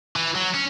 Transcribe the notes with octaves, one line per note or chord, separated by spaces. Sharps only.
E3
F#3
C#4